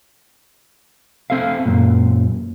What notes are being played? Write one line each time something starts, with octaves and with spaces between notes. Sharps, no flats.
C4 A4 E5 F5
F#2 A#2